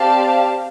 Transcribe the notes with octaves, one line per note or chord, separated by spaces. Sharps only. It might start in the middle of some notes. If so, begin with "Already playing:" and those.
Already playing: C4 G4 D5 F5 A5